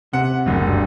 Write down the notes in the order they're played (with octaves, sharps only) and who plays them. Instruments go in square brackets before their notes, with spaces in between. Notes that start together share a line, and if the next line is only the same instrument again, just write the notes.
[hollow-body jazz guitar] C3 [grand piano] F#5
[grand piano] F#1 D2
[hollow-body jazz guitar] G2